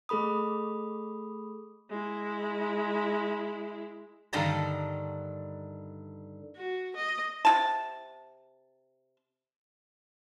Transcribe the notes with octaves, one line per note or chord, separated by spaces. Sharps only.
A3 G#4 A4 B5 D#6
G#3 E4
G2 D3 D#3 D#4 A5 A#5
F#4
D#5
C3 F4 A5